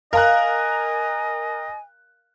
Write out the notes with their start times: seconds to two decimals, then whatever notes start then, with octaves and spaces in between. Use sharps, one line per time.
0.13 A#4 D#5 F5 G#5 A#5 F#6